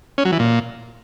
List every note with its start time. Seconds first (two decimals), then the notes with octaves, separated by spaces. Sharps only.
0.18 C#4
0.25 F#3
0.32 E3
0.39 A#2